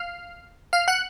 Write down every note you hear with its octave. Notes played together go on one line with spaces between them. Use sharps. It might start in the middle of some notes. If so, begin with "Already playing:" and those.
Already playing: F5 F6
F5 F6
F#5 F#6